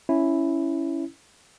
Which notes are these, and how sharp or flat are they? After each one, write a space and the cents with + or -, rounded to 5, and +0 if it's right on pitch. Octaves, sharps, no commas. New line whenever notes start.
C#4 +0 E4 +0